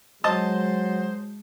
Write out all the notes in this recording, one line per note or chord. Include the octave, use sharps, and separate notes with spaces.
F#3 G#3 C5 D#5 A5 D#6